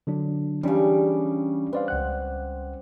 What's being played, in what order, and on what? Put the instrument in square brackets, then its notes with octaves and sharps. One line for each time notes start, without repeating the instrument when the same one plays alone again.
[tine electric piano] D3 F#3 D4
[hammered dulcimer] C#3 G3 [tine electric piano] E3 C#4 D4
[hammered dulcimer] C4 [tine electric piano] B4 D5 F5
[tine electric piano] C#2 F#5 F#6